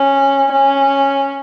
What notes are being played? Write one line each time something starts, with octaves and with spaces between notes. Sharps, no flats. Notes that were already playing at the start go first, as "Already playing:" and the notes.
Already playing: C#4
C#4